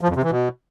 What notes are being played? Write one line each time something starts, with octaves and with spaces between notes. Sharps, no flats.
F3
F2
C3
E3
B2